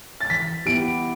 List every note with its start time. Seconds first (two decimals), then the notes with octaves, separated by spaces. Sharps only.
0.21 A6
0.30 E3 B6
0.66 B3 E4 G4 D7